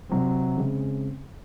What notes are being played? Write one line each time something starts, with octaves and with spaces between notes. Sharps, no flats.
C3 F#3 C4
C#3 G#3 C4